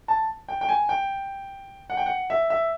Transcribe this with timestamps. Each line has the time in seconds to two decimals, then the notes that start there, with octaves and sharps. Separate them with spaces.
0.08 A5
0.48 G5
0.61 G5
0.69 G#5
0.89 G5
1.90 F#5
1.97 G5
2.06 F#5
2.30 E5
2.50 E5